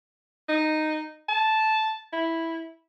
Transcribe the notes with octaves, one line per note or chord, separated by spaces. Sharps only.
D#4
A5
E4